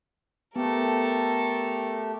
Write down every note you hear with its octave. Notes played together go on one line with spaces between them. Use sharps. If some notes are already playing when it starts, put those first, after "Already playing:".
A3 B3 G4 A4 A#4